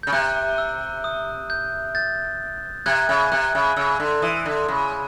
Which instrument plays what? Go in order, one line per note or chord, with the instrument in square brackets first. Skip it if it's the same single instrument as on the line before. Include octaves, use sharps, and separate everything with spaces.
[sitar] C#3 [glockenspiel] G6
[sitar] C3 [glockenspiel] F#6
[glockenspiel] E6
D#6
G6
G6 A6
[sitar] C3 [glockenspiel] F#6 G#6
[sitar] C#3
[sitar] C3 [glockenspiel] F#6
[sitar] C#3
[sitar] C#3 [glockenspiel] E6
[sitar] D3
[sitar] E3 [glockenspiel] D#6
[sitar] D3
C#3